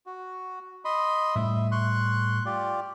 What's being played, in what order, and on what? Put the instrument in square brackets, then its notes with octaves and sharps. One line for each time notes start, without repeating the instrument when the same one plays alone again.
[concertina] F#4
D#5 B5 C6
[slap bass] A2 G3 [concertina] E5
[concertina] C6 C#6 F#6
F4 G4 D5